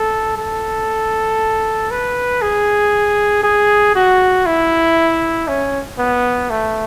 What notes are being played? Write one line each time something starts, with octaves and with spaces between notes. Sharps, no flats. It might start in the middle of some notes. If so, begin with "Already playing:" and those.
Already playing: A4
A4
B4
G#4
G#4
F#4
E4
C#4
B3
A3